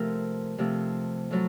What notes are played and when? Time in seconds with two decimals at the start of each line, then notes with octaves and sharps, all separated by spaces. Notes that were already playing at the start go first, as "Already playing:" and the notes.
Already playing: C3 F3 A3 A#4
0.58 C3 F3 A3
1.31 A2 F#3 A3